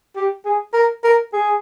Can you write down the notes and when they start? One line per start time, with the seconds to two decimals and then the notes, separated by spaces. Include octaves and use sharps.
0.16 G4
0.45 G#4
0.74 A#4
1.04 A#4
1.33 G#4